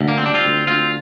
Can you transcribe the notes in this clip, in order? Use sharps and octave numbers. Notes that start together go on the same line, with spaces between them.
D2
A#3
C4
G3 D4
C4 F4
D2
D2 C4 F4